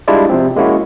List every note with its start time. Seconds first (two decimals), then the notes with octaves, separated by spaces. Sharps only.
0.08 G3 G#3 D4 E4 F4 D5
0.29 C3 F3 C4
0.56 G#3 A#3 C#4 E4 F#4